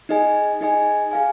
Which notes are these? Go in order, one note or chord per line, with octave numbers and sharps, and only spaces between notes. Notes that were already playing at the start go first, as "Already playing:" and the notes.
D#4 G#4 D#5 G#5
D#4 G#4 D#5 G#5
G#4 F5 G#5